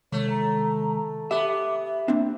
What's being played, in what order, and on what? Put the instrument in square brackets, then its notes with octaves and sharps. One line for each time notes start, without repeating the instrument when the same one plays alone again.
[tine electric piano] C3 D#3 G#3 [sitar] A3 [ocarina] C#5
[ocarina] A#5
[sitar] B3 [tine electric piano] G4 [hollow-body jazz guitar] E5 [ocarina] D6
[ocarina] E5
[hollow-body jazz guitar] A#3 C4 D4